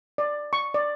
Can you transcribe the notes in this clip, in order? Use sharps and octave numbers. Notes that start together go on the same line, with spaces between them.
D5
C#6
D5